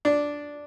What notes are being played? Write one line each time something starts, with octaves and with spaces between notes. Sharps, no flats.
D4